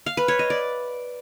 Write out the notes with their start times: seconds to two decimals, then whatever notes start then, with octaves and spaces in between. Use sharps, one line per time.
0.06 F5
0.17 B4
0.28 C#5
0.39 D#5
0.50 D5